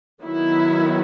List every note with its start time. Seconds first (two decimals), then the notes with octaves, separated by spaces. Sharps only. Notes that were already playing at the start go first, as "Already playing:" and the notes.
0.22 D#3 F#3 B3 E4